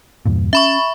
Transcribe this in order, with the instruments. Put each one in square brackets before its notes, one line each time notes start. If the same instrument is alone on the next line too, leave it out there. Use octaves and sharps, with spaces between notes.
[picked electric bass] E2 G2 A#2
[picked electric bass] C#4 [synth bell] E5 B5 C#6